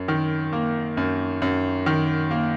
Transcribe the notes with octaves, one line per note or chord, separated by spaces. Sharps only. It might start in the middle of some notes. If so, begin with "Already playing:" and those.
Already playing: F#2
D#3
A#3
F#2
F#2
D#3
A#3